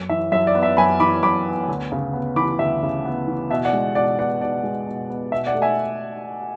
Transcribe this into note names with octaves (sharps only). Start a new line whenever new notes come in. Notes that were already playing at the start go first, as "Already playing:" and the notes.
Already playing: F#2
E3 E5
F#2 E5
D5
B3
E5
F#2 G#5 B5
E3 B5 D6
F#2 B5 D6
B3
D2
C#3
B3
E3 B5 D6
D2 E5
C#3
B3
E3
B2 E5
D5 F#5
G#3
B2 D5 F#5
B3 D5 F#5
B2 D5
G#3
B2
B3
B2 E5
D5 F#5
A3
E5 G#5